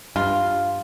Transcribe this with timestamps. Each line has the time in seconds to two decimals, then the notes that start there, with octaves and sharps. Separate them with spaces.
0.16 G2 F4